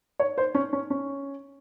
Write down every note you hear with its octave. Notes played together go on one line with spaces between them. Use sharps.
C#5
C5
C#4
C#4
C#4